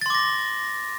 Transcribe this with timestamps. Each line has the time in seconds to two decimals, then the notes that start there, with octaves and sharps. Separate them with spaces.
0.01 A6
0.06 C6
0.10 D6
0.15 A#6